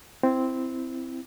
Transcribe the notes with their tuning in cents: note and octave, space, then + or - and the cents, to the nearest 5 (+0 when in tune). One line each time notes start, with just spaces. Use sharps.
C4 -5 E4 +5